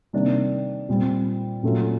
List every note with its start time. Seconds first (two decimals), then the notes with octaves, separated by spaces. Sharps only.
0.13 C3 D#3 G3 A#3 D4
0.89 A#2 G3 C4
1.63 A#2 F#3 A3 C#4 F4